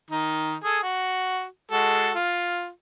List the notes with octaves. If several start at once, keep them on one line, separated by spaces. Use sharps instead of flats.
D#3 D#4
G#4 A4 G#5
F#4
G#3 F#4 A4
F4